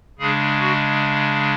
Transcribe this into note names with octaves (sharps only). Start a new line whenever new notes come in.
C#3 G#3 D4 G#4
F#4